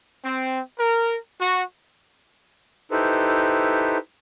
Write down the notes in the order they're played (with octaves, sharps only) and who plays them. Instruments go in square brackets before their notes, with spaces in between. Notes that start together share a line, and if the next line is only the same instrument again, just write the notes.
[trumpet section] C4
A#4
F#4
[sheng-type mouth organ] D#4 E4 G4 A4 B4 C5